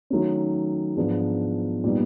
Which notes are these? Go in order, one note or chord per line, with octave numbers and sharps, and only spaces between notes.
D#3 F#3 A3 C#4
G#2 F3 G#3 B3 D4
A#2 G3 B3 D#4